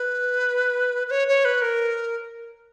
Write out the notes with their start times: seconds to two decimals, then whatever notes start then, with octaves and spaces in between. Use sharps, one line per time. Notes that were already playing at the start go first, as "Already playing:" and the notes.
Already playing: B4
1.07 B4
1.11 C#5
1.28 C#5
1.45 B4
1.62 A#4